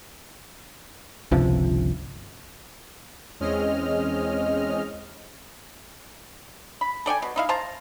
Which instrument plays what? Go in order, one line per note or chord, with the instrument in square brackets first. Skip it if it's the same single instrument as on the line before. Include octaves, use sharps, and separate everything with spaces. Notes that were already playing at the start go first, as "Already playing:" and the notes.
[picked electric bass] G1 C#2 C3 F3
[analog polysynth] E2 G#3 C4 C#4 D#5 F6
[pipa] B5
A4 D5 G5 G#5
B2
D#4 E4 F5
C5 F5 A5 A#5